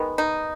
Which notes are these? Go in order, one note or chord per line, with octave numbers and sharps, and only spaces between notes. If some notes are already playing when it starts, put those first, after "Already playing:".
Already playing: D#3 G#3 B3
D#4